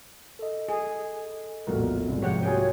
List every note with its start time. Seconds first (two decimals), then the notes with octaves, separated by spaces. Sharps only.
0.39 A4 D#5
0.69 G#4
1.67 A#1 E2 A2 F#4 A#4
2.08 C2 G#2
2.22 F3 G4 C#5 F#5 G5
2.43 A#3 F4 F#4 G#4 C#5 G5